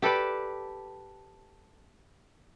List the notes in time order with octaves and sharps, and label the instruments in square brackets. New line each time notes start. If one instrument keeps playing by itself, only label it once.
[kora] G4 A4 B4 D5